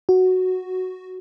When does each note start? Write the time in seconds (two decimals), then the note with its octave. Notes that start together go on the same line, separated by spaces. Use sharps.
0.09 F#4